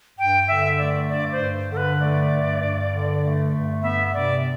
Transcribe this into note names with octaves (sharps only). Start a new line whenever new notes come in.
G2 G5
D3 E5
A3 D5
G2 D5
C5
G2
D3 A4
B4
A3 D5
G2
G2
D3
A3
G2
B3 E5
C3 D5